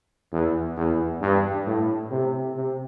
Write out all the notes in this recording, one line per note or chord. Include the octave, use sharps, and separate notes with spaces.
E2
E2
G2
A2
C3
C3